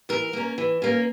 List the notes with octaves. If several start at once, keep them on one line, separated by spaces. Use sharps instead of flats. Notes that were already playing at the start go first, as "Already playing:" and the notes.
E3 A#4
A#3 C#4
E3
A#3 C#4